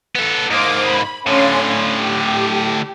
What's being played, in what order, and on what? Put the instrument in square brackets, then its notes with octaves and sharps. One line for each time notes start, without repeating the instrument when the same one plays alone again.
[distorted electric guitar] B3 A4
[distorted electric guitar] G#2 A#3 [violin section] C5 D6 D#6
[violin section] B5
[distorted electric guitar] A2 D3 [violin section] C#4 F5 C6
[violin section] G4